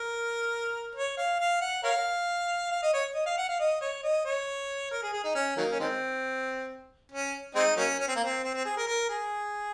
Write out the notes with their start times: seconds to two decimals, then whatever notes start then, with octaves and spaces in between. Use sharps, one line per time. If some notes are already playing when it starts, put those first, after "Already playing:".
Already playing: A#4
0.95 C#5
1.18 F5
1.40 F5
1.61 F#5
1.84 A#4 C#5 F5
2.71 F5
2.83 D#5
2.94 C#5
3.15 D#5
3.26 F5
3.38 F#5
3.49 F5
3.60 D#5
3.81 C#5
4.03 D#5
4.26 C#5
4.91 A#4
5.03 G#4
5.13 G#4
5.24 D#4
5.35 C#4
5.57 D#3 F#3 A#3
5.71 C#4
5.80 D#3 G#3 C4
7.12 C#4
7.55 G#3 C4 D#4
7.77 F#3 A#3 C#4
8.00 C#4
8.08 C4
8.16 A#3
8.25 C4
8.44 C4
8.54 C4
8.65 G#4
8.77 A#4
8.87 A#4
9.09 G#4